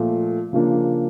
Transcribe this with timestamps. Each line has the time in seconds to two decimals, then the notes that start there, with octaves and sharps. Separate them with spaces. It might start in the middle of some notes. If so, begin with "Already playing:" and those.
Already playing: A#2 F3 A3
0.53 C#3 F3 A#3 D4